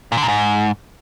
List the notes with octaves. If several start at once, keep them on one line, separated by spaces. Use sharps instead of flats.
A#2
D3
A#2
G#2